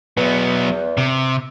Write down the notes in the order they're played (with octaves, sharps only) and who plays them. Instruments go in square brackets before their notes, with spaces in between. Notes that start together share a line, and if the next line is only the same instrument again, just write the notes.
[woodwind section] E2 [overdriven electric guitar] F#3 B3
[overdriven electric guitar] C3